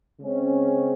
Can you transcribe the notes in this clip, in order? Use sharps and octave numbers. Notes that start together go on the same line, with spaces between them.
C#3 G#3 C4 C#4